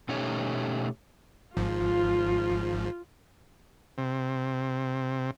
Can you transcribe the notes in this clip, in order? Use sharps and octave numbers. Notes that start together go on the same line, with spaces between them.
B2 A3 C#4 D#4 G4 C#5
G#1 G#2 F3 F4
C3